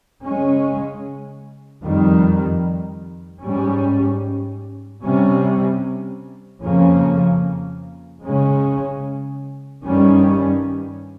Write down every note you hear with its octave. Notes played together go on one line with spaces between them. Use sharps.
C#3 G#3 C#4
F2 D#3 G3
G#2 G3 C#4
C3 G3 C#4
F2 C#3 F3 A#3 C#4
C#3 G#3 C#4
G2 D#3 G3 C#4